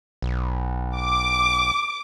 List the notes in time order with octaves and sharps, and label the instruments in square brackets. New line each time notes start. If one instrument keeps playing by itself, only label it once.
[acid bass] B1
[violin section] D6